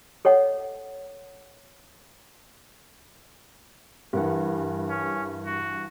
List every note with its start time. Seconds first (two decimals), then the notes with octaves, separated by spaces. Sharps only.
0.25 A4 C#5 D#5 F#5
4.13 G2 E3 G4 A#4 F#5
4.89 C#4
5.46 F#4